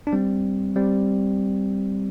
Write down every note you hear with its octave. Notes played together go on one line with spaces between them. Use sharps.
D4
G3 C4
G3 C4